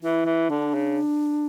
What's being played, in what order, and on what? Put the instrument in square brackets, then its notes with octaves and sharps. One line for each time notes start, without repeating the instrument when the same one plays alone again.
[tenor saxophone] E3 [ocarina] E4
[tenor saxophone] E3
[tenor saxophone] D3 [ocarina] D4
[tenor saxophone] C#3